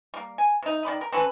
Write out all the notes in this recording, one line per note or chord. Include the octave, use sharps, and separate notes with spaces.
G3 A#3
G#5
C3 D#4
D#3 D5 B5
A#4
C4 C#4 A4 B4